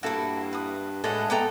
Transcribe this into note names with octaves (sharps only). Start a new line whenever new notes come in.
G2 A#3 E4 F#4 A4
B4 D#6
A2 G#3 A3 D4 A4 F#5
B3 A4 G5 A#5 D6